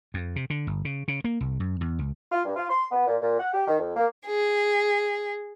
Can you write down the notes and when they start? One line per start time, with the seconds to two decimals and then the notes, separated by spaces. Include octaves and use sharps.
0.14 F2
0.36 C3
0.50 D3
0.67 G1
0.85 C#3
1.08 C#3
1.24 A#3
1.41 C2
1.60 F#2
1.81 E2
1.99 C#2
2.32 F4
2.45 G2
2.56 F4
2.69 C6
2.92 B3
3.07 A#2
3.21 A#2
3.39 F#5
3.53 G4
3.67 D#3
3.79 F2
3.96 A#3
4.25 G#4